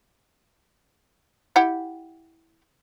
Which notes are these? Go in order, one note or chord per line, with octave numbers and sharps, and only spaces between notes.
E4 G4 F#5